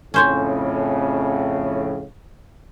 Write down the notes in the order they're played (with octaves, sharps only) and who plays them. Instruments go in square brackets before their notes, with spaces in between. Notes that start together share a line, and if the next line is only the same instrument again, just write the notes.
[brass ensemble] F2 A2 C#3 [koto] C#4 C5 C#5